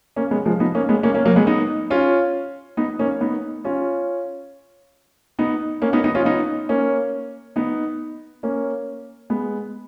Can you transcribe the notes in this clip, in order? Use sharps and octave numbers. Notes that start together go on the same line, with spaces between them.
A#3 C#4
G#3 B3
F3 G#3
B3 D#4
A#3 C#4
G#3 B3
A#3 C#4
A#3 C#4
F#3 A#3
G#3 B3
B3 D#4
C#4 F4
B3 D#4
A#3 C#4
B3 D#4
C#4 F4
B3 D#4
A#3 C#4
B3 D#4
B3 D#4
C#4 F4
B3 D#4
A#3 C#4
B3 D#4
A#3 C#4
G#3 B3